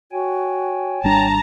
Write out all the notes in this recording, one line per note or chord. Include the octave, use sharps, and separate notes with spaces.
F#4 C#5 G5 G#5
G#1 G3 D4 A5 A#5